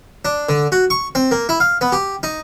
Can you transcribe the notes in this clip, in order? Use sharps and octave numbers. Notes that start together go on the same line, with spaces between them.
D4
D3
F#4
C#6
C4
A#3
E4
F5
B3
G4
D#4